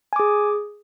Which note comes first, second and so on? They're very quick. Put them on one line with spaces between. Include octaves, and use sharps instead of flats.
G#5 D6 G#4